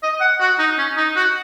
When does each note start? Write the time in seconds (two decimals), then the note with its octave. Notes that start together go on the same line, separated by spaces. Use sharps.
0.02 D#5
0.20 F#5
0.40 F#4
0.59 D#4
0.78 C#4
0.97 D#4
1.16 F#4